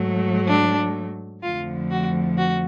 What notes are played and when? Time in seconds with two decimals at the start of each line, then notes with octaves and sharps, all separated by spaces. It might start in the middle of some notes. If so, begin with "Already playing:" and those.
Already playing: G#2 F#3 A3
0.48 D4
1.42 F2 D3 F3 A3 F4
1.91 F#4
2.37 F#4